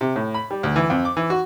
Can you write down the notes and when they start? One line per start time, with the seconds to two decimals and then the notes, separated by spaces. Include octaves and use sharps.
0.01 C3
0.16 A2
0.34 B5
0.51 G3
0.63 D2
0.76 E3
0.90 F2
1.05 D6
1.17 E3
1.30 F#4